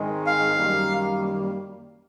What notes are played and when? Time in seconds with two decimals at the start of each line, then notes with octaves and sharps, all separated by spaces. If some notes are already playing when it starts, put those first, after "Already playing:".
Already playing: G#2 D#3 G#3 C4 D#4
0.26 F5
0.58 F#2 D#3 G3 A#3